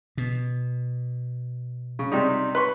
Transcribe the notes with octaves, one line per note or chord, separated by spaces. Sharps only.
B2
C#3
C3 G3 D#4
B4 C6 C#6